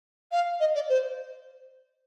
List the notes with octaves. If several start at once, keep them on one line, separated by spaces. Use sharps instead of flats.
F5
D#5
D5
C5